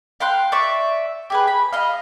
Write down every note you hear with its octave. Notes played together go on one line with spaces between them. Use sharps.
F5 G5 C6 F#6
D5 E5 C#6
G4 G#4 B4
B5
D#5 F5